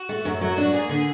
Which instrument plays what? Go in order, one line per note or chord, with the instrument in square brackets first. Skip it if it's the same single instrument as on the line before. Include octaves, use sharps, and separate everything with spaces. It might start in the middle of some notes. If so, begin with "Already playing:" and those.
Already playing: [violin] F#4
[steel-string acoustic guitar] A3
F#2
[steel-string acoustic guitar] F#3 [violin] F#4
[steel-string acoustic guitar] D4
[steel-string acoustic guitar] A#3 [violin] G#4
[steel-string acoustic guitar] D3